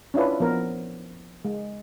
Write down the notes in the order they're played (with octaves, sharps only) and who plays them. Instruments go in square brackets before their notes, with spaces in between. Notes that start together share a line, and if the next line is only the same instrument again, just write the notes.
[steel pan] C#4 D4 E4 F4 B4
F3 B3 A#4
G#3